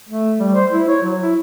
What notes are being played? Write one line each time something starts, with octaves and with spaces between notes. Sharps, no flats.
A3
G3
C5
E4
C#5
F#3
E4